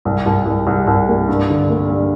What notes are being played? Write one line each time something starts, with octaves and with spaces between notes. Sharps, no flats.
C2
C2
C2
C2
C2
A#3
G2
D3
A#3
G2